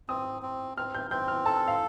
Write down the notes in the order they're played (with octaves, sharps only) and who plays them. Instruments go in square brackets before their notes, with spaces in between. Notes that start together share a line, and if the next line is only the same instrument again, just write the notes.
[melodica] C4 [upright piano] D#6
[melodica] C4
[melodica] C4 [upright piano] F6
[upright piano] G6
[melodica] C4 [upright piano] G6
[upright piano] F6
[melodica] A4 [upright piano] A5
[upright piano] F5